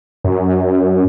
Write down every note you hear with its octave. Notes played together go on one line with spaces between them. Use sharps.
F#2